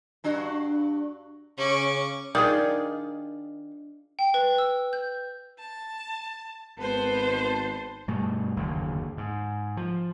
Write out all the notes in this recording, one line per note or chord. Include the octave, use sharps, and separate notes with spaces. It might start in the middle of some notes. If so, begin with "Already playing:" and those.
G2 D4 F#4
C#3 C#4 C#6 D6
D#3 D4 F4 G#4
G5
B4
E6
G6
A5
G#1 B3 C5 A5
G2 B2 A3
F#1 D#2 D3
G#2
F3